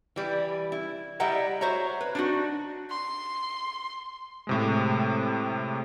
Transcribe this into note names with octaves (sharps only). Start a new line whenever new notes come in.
E3 G3
E4
G3 E4 D#5 E5 F#5 A#5
F#4 C5 C#5 E5 A#5
B4
D4 D#4 F#4
C6
A2 C3 G#3